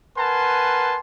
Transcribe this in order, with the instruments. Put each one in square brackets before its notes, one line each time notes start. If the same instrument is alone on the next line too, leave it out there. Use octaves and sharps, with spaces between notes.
[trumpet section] A#4 B4 F#5 G#5 A5 C6